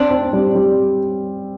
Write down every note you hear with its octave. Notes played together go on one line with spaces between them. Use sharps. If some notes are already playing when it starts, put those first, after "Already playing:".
Already playing: C4 D4 D5
C4
G3
G3